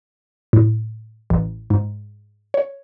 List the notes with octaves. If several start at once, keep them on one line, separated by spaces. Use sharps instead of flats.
A2
A1
G#2
C#5